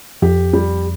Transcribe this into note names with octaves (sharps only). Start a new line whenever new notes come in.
F2 G4
G3